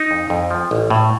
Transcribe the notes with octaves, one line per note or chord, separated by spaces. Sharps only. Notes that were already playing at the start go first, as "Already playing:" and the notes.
Already playing: D#4
F2
F2
F3
A1
A2